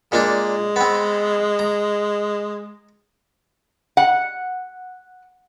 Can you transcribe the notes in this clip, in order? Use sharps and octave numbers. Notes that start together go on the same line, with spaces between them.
A#2 G#3 A#3 D4
B3 C4
A#5
F#5